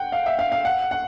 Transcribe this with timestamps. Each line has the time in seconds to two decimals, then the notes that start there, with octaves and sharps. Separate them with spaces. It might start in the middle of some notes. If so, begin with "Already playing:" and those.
Already playing: F#5 G5
0.12 F5
0.26 E5
0.39 F5
0.52 F5
0.65 F#5
0.91 F#5